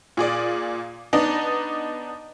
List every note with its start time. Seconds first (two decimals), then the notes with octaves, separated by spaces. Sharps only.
0.17 A#2 G#4 D5
1.13 B3 D4 D#4